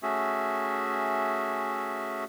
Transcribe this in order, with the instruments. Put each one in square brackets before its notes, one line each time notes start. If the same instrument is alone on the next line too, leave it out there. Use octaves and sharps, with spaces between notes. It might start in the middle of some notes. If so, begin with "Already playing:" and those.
[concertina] A3 C#4 F#4 G#4 E5